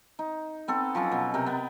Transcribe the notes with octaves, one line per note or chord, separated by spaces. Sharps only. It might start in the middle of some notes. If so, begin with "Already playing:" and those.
D#4
B3 C4 A4
F3 F#3 C#4
B2
C3 A#4 G5
B3